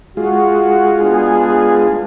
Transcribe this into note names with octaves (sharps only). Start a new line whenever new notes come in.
G#3 F4 F#4
B3 D4 G#4